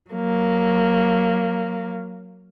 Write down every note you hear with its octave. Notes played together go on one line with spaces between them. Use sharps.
F#3 A#3